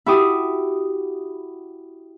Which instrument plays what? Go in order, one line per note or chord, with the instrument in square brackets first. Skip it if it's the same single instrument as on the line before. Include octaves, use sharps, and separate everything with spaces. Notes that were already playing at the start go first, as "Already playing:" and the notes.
[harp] E4 F#4 G4 D#6